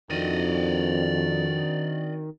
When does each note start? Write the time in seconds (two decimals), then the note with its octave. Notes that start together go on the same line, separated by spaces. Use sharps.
0.10 F2 D#3 C4 D4 F#4 D5 D#5